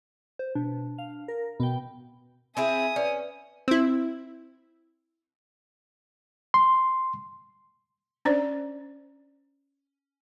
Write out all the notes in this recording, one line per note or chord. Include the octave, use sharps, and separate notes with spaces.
C5
B2 D4
F5
A#4
B2 B3 G5
C4 E4 G#4 E5 G#5 D#6
C#4 B4 D5
C4 E4
C6
C#4 D4 C5 D5